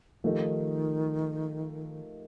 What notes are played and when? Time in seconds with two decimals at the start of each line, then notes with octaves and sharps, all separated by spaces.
0.24 D#3 F3 A3 D#4 G4 A#4